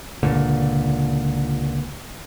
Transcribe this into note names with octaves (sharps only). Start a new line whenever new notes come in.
C#2 A#2 D3